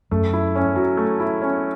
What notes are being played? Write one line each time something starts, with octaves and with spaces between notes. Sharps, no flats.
F#2 A3
E4
C#4
F#3
A3
E4
C#4